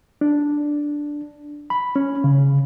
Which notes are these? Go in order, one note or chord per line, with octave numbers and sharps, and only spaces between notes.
D4
B5
C#4
C#3